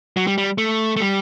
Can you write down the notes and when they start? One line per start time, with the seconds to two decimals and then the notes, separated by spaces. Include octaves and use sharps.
0.17 F#3
0.27 G3
0.38 G3
0.58 A3
0.96 A3
1.01 G3